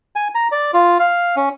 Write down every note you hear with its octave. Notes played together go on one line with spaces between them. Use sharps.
G#5
A#5
D5
F4
F5
C#4